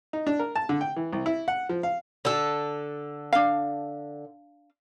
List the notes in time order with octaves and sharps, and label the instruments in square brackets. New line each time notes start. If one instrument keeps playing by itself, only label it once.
[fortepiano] D#4
D4
A#4
A5
D3
G5
E3
C2
E4
F#5
F3
F5
[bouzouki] D3 A4
[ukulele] D4 F5